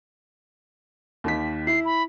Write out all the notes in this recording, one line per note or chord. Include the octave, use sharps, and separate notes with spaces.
D#2 D#3 B6
E4 C7
B5